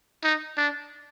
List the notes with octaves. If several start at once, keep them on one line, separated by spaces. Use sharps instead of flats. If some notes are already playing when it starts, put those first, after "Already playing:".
D#4
D4